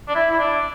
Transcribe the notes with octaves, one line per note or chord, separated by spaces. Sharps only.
D4
E4
E4
D4